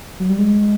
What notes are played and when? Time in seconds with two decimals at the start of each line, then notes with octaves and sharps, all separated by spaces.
0.20 F#3
0.29 G3
0.39 G#3